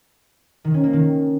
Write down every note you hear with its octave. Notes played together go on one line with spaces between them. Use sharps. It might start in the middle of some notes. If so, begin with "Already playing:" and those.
D#3
C#4
A#3
D#3